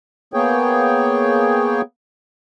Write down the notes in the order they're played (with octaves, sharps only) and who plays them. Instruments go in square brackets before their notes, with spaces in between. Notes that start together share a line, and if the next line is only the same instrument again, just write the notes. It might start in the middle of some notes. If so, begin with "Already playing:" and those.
[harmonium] A#3 B3 G#4 C#5 G5